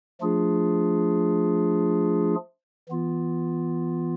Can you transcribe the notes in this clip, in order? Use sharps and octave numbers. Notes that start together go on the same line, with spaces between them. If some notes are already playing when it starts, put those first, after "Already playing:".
F3 A3 D4 F4 G#4
E3 B3 F4